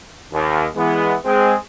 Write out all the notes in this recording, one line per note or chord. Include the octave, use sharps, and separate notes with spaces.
D#2
E3 G#3 B3
G#3 C4 G#4